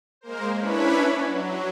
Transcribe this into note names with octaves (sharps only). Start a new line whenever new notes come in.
G#3 A#3 A#4 C5
C#4 D4 E4 B4 C#5 B5
F#3